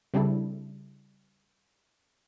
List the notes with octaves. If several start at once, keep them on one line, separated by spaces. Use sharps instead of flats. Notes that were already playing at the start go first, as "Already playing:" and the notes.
C#3 G3 C4 D4 E4 A4